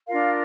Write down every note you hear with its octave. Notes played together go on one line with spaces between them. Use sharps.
D4 F4 A#4 F5